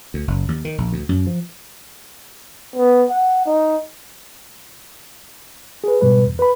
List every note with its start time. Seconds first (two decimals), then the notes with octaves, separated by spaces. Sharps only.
0.14 D2
0.28 F#1
0.48 D#2
0.65 D#3
0.78 A#1
0.93 D2
1.09 F#2
1.27 F3
2.76 B3
3.10 F#5
3.45 D#4
5.84 G#4 B4
6.01 G#2 B2 G3 B4
6.26 E2
6.39 B4 B5